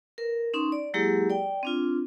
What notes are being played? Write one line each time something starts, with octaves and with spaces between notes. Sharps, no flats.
A#4 B4
C#4 D#4 C6
D5
F#3 G#3 A#3 E4 G4 G#4
D5 G5
C4 D4 F4